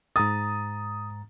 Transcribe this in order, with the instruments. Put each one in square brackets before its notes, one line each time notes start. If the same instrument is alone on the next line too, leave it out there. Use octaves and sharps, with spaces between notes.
[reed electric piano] G#2 A#5 A6 [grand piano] D#6